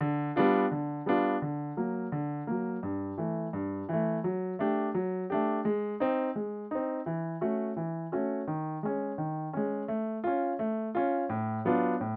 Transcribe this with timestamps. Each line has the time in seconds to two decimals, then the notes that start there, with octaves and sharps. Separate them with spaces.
0.01 D3
0.36 G3 B3 D4 F4
0.71 D3
1.06 G3 B3 D4 F4
1.42 D3
1.77 F#3 A#3
2.12 D3
2.47 F#3 A#3
2.83 G2
3.18 E3 A3
3.53 G2
3.89 E3 A3
4.24 F#3
4.59 A3 D4 G4
4.95 F#3
5.30 A3 D4 G4
5.65 G#3
6.00 C4 D#4
6.36 G#3
6.71 C4 D#4
7.06 E3
7.41 A3 C#4 F#4
7.77 E3
8.12 A3 C#4 F#4
8.48 D#3
8.83 G#3 C#4
9.18 D#3
9.53 G#3 C#4
9.88 A3
10.24 C#4 F4
10.59 A3
10.95 C#4 F4
11.29 A2
11.65 F#3 B3 D4 F4
12.01 A2